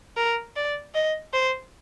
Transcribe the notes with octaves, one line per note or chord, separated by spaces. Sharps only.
A#4
D5
D#5
C5